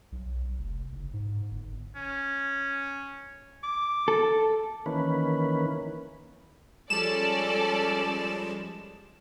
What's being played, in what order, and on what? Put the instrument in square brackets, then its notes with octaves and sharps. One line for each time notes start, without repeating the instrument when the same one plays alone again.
[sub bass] B1
F1
F#1
G#2
G1
[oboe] C#4
D6
[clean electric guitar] A4
[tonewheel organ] D#3 E3 A#3 C#4 B4
[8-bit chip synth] F3 G3 G#3 [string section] C#4 A4 D5 [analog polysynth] E7